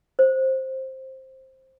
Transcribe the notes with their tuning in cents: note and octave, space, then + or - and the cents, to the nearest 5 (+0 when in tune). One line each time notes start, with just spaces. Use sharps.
C5 +10